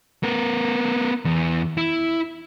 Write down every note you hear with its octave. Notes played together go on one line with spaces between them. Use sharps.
B3 A#4
E2
E4